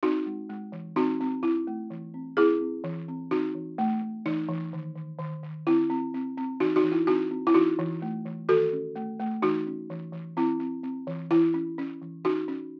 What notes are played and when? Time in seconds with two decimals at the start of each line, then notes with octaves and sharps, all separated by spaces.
0.03 C4 D#4 F#4
0.26 G#3
0.50 G#3
0.72 E3
0.96 C4 D#4 F#4
1.20 C4
1.43 C4 E4
1.67 A3
1.90 E3
2.14 C4
2.37 C4 E4 G#4
2.61 C4
2.84 E3
3.08 C4
3.31 C4 D#4 F#4
3.55 E3
3.78 A3
4.02 A3
4.26 E3 D#4
4.49 E3
4.73 D#3
4.95 D#3
5.19 D#3
5.43 D#3
5.67 C4 E4
5.90 C4
6.14 C4
6.38 C4
6.60 E3 D#4 F#4
6.76 D#4 F#4
6.84 E3
6.92 E4
7.07 C4 D#4 F#4
7.31 C4
7.47 E4
7.54 E3 D#4 F#4
7.79 E3
8.02 A3
8.26 E3
8.49 D#3 F#4 A4
8.73 C#4
8.96 A3
9.19 A3
9.42 E3 D#4 F#4
9.67 C#4
9.90 E3
10.13 E3
10.37 C4 E4
10.60 C4
10.83 C4
11.07 E3
11.31 E3 E4
11.54 C#4
11.78 C#4
12.02 E3
12.24 C#4 D#4 F#4
12.48 C#4